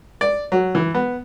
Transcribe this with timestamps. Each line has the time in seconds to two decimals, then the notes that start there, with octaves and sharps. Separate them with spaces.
0.21 D5
0.52 F#3
0.75 E3
0.94 B3